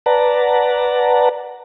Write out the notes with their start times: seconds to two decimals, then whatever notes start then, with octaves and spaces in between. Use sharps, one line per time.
0.06 B4 D5 F#5 A5 A#5